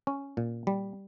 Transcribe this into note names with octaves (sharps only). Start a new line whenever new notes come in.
C#4
A#2
G3